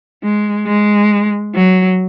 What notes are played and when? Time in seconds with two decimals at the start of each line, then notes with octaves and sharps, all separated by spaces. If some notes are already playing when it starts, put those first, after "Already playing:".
0.23 G#3
0.67 G#3
1.55 F#3